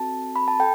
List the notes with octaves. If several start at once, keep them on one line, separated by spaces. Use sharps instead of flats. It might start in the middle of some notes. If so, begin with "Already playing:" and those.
Already playing: C4 F#4 A4 A5
B5
A5
A4 G5